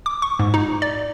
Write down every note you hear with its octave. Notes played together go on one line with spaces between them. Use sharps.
D6
C#6
G#2
D#4
D5